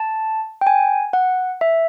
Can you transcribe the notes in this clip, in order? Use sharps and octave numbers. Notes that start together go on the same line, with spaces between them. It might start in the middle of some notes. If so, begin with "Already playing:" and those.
Already playing: A5
G5
G#5
F#5
E5